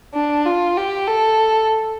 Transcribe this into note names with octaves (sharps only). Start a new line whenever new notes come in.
D4
F4
G4
A4